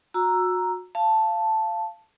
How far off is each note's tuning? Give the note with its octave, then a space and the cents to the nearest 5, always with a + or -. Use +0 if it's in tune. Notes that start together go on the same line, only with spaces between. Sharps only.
F#4 -30 A#5 +0 E6 +10
F5 -20 A5 +0